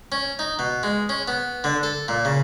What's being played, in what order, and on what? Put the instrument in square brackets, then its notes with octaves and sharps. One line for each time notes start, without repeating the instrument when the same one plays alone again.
[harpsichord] C#4
D#4
B2
G#3
C#4
B3
D3
A4
A#2
C#3